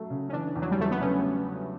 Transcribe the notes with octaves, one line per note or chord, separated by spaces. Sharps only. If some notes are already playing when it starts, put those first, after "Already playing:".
Already playing: F#3 A3
C#3
C#4
E3 D4
E2
F#3
G3
E2 A3
B3
C#3 C#4